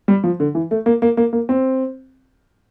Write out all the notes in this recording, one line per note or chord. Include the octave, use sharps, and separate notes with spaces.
G3
F3
D3
E3
A3
A#3
A#3
A#3
A#3
C4